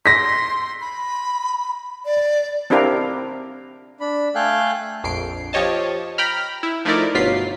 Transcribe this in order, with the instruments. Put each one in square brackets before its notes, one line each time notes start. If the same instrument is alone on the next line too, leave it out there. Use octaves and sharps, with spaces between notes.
[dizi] C6 [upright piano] A#6 B6
[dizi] B5
D5
[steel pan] C4 D4 E4 G4 A#4 F5
[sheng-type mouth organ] D4 B5
A3 A4 F5 G5 G#5 F#6
[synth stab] A#1 F2 C7 D7
F3 G4 C#5 D#5 A5
G5 A#5 B5 F6
E4
F3 A3 D#4 E4 A#4 D5
G1 B2 F#3 F4 B6 C7